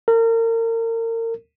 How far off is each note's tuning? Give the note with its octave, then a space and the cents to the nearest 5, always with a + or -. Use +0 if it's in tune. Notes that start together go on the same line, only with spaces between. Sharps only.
A#4 -35